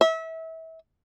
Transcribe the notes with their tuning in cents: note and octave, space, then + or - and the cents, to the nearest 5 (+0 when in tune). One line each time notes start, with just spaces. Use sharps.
E5 -30